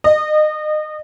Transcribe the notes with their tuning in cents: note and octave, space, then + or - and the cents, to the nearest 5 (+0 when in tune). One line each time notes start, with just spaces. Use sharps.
D#5 -30